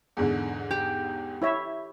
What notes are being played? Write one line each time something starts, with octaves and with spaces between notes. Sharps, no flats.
E2 G#2 D3
G4
E4 C#5 E5